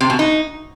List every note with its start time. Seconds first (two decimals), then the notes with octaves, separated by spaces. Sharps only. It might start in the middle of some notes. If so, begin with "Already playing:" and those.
0.01 C3
0.10 B2
0.19 D#4